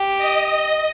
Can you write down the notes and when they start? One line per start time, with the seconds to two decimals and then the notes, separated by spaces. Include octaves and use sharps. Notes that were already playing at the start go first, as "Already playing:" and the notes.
Already playing: G4
0.18 D#5